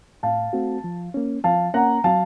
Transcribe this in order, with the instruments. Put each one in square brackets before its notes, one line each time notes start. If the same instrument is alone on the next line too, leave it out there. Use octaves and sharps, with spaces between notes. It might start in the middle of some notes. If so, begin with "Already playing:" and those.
[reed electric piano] A2 [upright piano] F5 A5
[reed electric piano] A3 C4 F#4
F3
A#3 C#4
[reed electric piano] F3 [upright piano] F5 A5
[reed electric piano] A#3 C#4 [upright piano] F#5 A#5
[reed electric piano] F#3 [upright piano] F5 A5